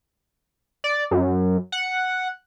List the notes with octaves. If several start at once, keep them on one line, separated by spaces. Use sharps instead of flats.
D5
F#2
F#5